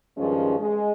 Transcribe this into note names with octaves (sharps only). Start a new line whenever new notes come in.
G2 D#3 F3 G#3 C#4
G#3